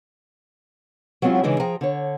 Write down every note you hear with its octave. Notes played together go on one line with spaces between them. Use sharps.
F#3 G#3 C4 C#4 E4 F4
C#3 E3 G#3 D4 D#4 G#4
F3 G#4 G5 A#5
D3 C#5